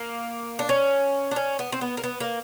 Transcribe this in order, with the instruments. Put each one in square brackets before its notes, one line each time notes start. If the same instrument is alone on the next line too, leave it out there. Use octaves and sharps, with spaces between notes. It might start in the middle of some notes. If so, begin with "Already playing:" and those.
Already playing: [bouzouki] A#3
D4
C#4
D4
C#4
B3
C4
B3
A#3
B3
A#3